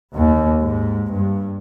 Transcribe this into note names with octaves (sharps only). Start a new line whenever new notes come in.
D#2
G#2
G2